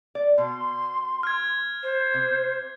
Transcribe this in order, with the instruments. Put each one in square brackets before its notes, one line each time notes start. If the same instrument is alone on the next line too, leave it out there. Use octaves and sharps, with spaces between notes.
[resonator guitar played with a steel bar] D5
[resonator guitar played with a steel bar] B2 [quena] C6
[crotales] F6 G#6
[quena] C5
[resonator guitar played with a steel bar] C3